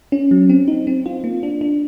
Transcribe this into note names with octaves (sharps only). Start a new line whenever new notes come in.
C#4
F#3
C4
D#4
C4
F4
A#3
D4
D4